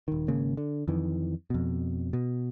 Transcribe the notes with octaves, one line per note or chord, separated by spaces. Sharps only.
D#1 D#3
G#1 C#3 A#3
D3
F2 D#3 E3
F2 B2
B2